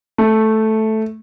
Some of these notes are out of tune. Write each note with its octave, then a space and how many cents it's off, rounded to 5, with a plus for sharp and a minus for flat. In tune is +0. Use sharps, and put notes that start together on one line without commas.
A3 -5